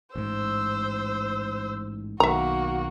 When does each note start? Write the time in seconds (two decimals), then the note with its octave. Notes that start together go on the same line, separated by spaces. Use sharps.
0.16 A1 G#2 C5 E6
2.20 B1 B2 D#3 A#3 F#4 E5 A#5